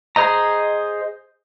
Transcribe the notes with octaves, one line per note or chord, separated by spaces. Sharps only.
G#4 C5 D#5 A#5